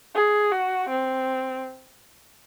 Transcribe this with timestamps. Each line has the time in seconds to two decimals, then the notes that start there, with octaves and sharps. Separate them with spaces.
0.15 G#4
0.52 F#4
0.89 C4